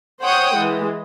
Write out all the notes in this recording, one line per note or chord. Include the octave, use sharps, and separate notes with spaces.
C5 C#5 F#5 G5 D#6
E3 G#3